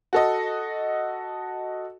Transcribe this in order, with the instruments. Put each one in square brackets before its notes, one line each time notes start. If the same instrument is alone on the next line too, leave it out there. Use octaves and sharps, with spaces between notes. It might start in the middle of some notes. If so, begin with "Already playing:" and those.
[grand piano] F#4 A4 D#5